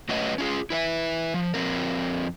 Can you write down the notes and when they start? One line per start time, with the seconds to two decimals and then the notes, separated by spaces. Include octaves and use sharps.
0.09 F#3 A3 C#4 F#4 B4 D#5
0.38 C#4 F4 G#4
0.70 E4 B4 D#5 E5
1.34 F3
1.54 F2 F3 G#3 C4 A#4